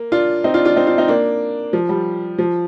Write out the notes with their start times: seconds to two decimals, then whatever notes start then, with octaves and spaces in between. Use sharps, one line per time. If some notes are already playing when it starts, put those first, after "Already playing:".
Already playing: A#3
0.12 D4 F4
0.44 C4 D#4
0.54 D4 F4
0.65 D4 F4
0.76 C4 D#4
0.87 D4 F4
0.98 C4 D#4
1.08 A#3 D4
1.73 F3
1.89 G3
2.39 F3